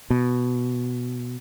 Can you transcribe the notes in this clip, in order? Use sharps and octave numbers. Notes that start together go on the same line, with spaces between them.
B2